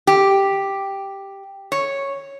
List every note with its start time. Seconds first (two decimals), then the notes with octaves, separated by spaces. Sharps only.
0.07 G4
1.72 C#5